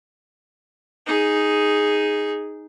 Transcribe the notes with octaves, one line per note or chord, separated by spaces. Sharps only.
D#4 G#4